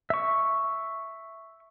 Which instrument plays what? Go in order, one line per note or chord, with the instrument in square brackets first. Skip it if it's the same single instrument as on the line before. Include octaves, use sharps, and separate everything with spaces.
[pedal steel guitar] E5 C#6